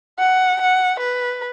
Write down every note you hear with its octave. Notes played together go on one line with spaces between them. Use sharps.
F#5
F#5
B4